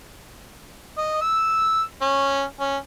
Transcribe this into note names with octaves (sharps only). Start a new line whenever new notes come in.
D#5
E6
C#4
C#4